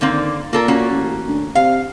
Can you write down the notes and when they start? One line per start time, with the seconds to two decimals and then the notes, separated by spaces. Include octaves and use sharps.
0.01 D3 D#3 A#3 C4
0.53 A#2 A#3 A4 A#4
0.68 A#3 C#4 F#4
0.91 A1
1.27 D2
1.55 C3 F5